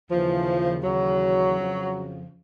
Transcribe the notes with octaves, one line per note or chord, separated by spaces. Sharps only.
D#2 C#3 E3 F3
D#2 C#3 E3 F#3
F2 C#3 F3